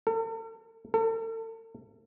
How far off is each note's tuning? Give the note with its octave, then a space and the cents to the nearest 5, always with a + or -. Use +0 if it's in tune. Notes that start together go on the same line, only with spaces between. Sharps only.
A4 +45
A4 +40